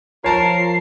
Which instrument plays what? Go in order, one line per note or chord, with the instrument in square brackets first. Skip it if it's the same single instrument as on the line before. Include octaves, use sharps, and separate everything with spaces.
[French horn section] F3 F4 [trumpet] A#4 [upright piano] C#5 A5 A#5 [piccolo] C7